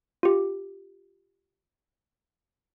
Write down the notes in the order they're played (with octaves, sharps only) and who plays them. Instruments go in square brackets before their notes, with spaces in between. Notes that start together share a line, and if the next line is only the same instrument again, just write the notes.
[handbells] F4 G4